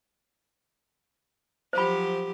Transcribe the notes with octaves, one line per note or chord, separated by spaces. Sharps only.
F3 F#3 G4 C5 B5